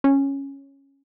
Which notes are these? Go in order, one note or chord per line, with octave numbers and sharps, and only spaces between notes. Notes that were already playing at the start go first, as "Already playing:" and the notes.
C#4